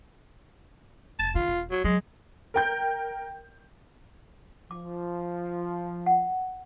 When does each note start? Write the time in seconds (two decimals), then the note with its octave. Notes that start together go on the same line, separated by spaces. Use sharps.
1.19 F1 A5
1.35 D#3 F4
1.48 E1
1.71 F#3
1.84 F#3 G#3
2.54 A#4 G5 G6
4.71 F3 D6
6.06 F#5